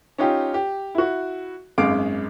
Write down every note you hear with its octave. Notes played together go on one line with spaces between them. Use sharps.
C#4 D#4 F4 G4
G4
E4 F#4
G#1 F#2 G#3 F5 D6 D7